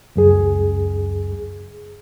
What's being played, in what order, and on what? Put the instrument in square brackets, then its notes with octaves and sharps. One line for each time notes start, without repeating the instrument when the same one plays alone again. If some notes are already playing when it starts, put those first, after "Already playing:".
[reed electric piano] C#2 F#2 G#4